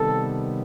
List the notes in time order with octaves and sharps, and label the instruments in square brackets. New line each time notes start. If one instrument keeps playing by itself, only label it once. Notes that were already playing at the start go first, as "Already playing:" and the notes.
Already playing: [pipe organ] C3 D#3 G3 B3 [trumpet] A4